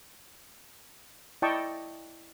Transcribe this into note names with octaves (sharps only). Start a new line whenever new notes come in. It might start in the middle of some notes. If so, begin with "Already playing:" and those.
E4 D5 D#5 G5 A5 C#6